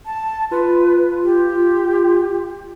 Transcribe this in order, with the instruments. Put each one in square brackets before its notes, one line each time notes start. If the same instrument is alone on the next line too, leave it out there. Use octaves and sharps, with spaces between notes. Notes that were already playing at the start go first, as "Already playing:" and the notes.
[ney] A5
[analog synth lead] F4 [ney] B4
[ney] G4